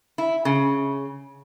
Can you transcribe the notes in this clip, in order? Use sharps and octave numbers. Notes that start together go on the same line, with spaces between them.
E4
C#3